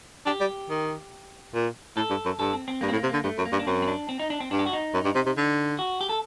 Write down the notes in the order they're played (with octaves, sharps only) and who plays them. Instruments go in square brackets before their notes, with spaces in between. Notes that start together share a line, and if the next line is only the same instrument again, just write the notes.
[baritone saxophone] D4 [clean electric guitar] G4
[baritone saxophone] G3
D#3
A#2
[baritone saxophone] A2 [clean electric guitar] A4
[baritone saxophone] G2
F#2
[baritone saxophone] G2 [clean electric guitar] A4
[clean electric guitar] C4
C4
[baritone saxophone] G2 [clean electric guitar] A#3
[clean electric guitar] C4
[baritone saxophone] A2
[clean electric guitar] A#3
[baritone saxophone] C3
[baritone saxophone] D3 [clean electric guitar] A#3
[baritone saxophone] G2 [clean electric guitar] A3
[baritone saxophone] F#2
[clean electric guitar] A#3
[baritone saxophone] G2
[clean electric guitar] D4
[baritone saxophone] F#2 [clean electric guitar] C4
[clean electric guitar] C4
D4
C4
D#4
D4
C4
[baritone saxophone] G2 [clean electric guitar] D4
[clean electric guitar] G4
F#4
D#4
[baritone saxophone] F#2
G2
C3
C3
D3
[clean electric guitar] F#4
G4
A4